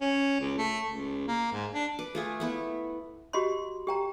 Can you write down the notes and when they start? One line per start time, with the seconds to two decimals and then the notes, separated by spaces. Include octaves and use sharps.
0.01 C#4
0.40 C#2
0.58 A3
0.88 C#2
1.28 A#3
1.52 G#2
1.74 D4
1.99 B4 D6
2.15 A3 F4 G#4
2.40 A3 B3 E4
3.33 F#4 G4 D#5 B5 C6
3.87 G4 G5 A#5